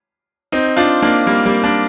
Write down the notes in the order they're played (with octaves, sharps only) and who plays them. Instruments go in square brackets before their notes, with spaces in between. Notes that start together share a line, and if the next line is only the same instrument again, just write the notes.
[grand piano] C4 D#4
D4 F4
A#3 D4
G3 A#3
G3 A#3
A#3 D4